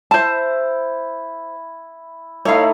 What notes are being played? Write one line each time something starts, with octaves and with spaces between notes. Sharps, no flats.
E4 C5 A5
A3 D#4 E4 C#5 F5